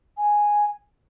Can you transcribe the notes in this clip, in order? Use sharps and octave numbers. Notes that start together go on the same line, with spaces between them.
G#5